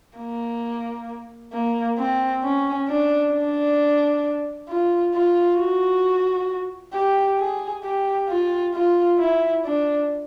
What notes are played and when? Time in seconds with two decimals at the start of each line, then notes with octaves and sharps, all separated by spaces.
0.17 A#3
1.53 A#3
1.98 C4
2.43 C#4
2.88 D4
3.34 D4
4.68 F4
5.14 F4
5.58 F#4
6.93 G4
7.38 G#4
7.84 G4
8.28 F4
8.75 F4
9.18 E4
9.65 D4